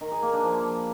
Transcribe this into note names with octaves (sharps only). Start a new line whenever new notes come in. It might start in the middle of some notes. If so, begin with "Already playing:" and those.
D#3
G#4
A#3
D4
F3